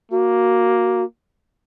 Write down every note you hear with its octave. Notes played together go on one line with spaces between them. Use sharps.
A#3 F#4